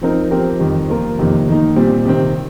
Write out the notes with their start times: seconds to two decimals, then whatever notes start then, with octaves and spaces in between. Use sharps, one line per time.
0.01 F3 C4 D#4 A#4
0.31 F3 C4 G4 A#4
0.60 F2 D#3 G3
0.89 F3 A#3 F4 A#4
1.18 F2 C3 D#3 A#3
1.48 D#3 A#3 D#4
1.76 A#2 G3 C4
2.05 C3 D#3 C4